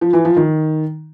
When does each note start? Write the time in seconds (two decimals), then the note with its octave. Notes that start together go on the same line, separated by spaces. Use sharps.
0.01 F3
0.13 E3
0.25 F3
0.36 D#3